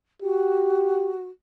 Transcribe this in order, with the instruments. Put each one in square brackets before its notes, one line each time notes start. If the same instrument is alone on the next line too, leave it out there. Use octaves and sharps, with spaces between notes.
[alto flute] F#4 [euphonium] G4